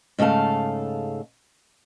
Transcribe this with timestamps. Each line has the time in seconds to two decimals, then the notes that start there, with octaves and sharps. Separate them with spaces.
0.19 G#2 C#3 A3 A4 F5